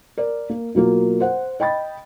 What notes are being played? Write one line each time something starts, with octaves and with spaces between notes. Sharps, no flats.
A#4 D5
A#3
B2 F#3 A#3 F4
C5 F#5
D#5 G5 B5 A6